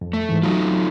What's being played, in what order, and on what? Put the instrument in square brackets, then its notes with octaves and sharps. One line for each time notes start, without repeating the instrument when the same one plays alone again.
[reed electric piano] F2
[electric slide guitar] A3
[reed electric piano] G#2 E3
[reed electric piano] F#3 [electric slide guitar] A3 D#4 F4